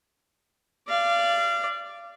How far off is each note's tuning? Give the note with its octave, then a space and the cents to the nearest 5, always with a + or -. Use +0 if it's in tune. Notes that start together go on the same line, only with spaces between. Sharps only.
D5 +0 F5 -30